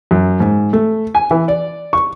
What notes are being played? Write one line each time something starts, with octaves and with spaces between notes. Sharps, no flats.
F#2
G#2
A3
G#5
E3
D5
C#6